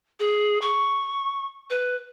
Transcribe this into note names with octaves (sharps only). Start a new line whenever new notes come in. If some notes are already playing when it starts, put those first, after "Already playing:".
G#4
C#6
B4